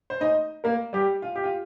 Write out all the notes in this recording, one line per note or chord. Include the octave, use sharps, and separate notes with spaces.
C5
D#4 D#5
A#3 A#4
G3 G4
F4
G4
F4